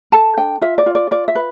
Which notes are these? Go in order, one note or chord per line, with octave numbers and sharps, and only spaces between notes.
A4 A5
D4 G5
F4 E5
D5
F4
D5
F4 D5
E5
B4